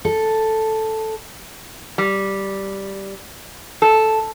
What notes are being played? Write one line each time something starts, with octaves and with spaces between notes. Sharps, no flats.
A4
G3
A4